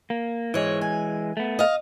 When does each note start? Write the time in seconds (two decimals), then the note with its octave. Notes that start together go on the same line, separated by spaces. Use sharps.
0.10 A#3
0.54 G#2 E3 G#3 C#5
0.81 G#5
1.37 A3 B3
1.59 D#5 F5